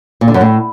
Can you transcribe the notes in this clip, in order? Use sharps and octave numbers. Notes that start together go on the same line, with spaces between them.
A#2
D3
F#2
A2